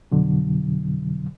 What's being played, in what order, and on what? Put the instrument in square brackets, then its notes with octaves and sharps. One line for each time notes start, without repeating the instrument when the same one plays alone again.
[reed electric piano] F2 B2 D3 F#3